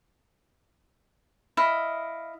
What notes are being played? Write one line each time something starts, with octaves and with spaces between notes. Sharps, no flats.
E4 D#5 F5